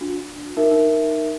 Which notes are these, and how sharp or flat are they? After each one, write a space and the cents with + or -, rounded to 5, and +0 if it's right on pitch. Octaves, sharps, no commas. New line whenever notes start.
D4 +0 F#4 -45
D#4 -10 A#4 +0 E5 +0